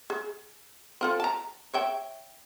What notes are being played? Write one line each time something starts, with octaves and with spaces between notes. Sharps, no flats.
G#4
C4 F4 A4
A5 A#5
C#5 E5 G5